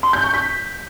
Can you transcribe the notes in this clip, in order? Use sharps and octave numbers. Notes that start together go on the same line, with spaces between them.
C6
G6
C#6
B6